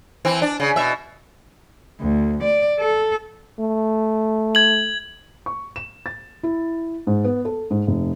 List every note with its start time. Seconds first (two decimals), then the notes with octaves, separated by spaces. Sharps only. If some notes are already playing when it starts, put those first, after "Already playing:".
0.25 E3 C4
0.42 D4
0.60 C#3
0.76 B2 E5
2.01 D2
2.44 D5
2.79 A4
3.59 A3
4.55 G#6 F#7
5.46 C#6
5.76 E7
6.06 A6
6.43 E4
7.07 G#2
7.24 B3
7.45 A4
7.71 G#2
7.87 F1